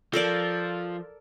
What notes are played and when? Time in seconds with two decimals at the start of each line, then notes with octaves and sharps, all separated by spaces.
0.13 F3 A4 A#4 D5